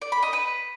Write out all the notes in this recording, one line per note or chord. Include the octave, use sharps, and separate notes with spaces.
D5
B5
D#5
B4